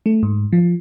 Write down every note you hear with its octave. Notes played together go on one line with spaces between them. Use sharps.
A3
G#2
F3